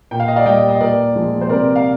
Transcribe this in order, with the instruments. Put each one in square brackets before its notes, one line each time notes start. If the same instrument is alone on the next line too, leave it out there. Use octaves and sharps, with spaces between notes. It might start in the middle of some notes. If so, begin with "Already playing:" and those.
[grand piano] A#2 G5
F5
D#5
D5 F5
G3 D#5 G5
D#5
A#2 A#4 D5
F3 G#3
C5
C3 A#4 D5
F5